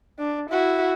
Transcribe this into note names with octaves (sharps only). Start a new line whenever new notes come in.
D4
E4 F#4